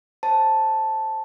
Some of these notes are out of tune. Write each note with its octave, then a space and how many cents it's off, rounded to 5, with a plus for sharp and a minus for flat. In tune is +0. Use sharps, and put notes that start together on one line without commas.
C5 +25 A5 +0